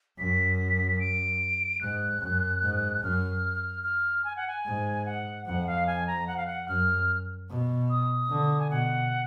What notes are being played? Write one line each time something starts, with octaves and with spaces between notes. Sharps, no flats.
F#2 B6
D7
G#2 F#6
F#2
G#2
F#2 F6
F6
G#5
F#5
G#5
G#2
F#5
F2 F#5
F5
G#5
A#5
F#5
F5
F#5
F#2 F6
B2
D#6
D3
G#5
B2 F#5